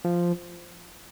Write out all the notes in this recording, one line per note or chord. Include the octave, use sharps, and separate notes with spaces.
F3